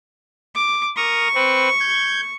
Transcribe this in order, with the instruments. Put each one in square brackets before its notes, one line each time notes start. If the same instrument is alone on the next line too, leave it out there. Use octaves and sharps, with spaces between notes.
[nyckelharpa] D6
[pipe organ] A#4 D#6 [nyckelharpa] C#6
[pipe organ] C4 B4
G6 G#6